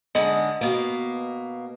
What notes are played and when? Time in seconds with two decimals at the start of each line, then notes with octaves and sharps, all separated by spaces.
0.15 G#2 D3 G#3 D#5
0.61 B2 A#3